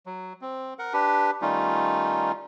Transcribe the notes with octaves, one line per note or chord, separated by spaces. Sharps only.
F#3
C4
A#4 F#5
D4 G4 B4
D#3 G3 A3 C#4 D#4 F4